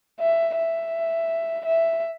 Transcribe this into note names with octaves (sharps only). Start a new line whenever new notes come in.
E5
E5
E5